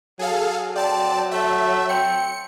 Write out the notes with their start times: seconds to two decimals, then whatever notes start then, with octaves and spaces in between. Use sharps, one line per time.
0.19 F#3 G#4 A4 F5
0.76 C4 D5 A5
1.31 A3 E5
1.89 C4 C#7